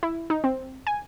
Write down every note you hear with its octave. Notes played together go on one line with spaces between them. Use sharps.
E4
D#4
C4
G#5